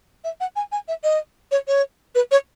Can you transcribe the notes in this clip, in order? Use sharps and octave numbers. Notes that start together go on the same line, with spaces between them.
E5
F#5
G#5
G#5
E5
D#5
C#5
C#5
B4
C#5